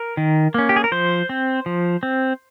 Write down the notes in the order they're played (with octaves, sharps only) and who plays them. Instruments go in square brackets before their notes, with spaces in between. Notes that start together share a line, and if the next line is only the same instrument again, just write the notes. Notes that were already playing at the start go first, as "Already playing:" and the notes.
Already playing: [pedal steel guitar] A#4
D#3
A#3 C#4
G4
G#4
A#4
F3 C5
C4
F3
C4